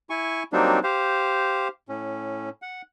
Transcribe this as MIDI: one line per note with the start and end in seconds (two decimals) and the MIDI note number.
0.10 0.43 64
0.10 0.43 80
0.10 0.43 85
0.53 0.79 54
0.53 0.79 55
0.53 0.79 58
0.53 0.79 60
0.53 0.79 62
0.53 0.79 63
0.83 1.68 67
0.83 1.68 72
0.83 1.68 77
1.89 2.49 45
1.89 2.49 61
2.62 2.82 78